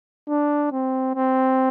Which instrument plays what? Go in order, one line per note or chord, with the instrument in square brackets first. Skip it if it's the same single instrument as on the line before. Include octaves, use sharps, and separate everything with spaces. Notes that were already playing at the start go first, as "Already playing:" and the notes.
[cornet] D4
C4
C4